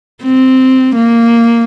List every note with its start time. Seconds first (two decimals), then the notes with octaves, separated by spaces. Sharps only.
0.24 C4
0.95 A#3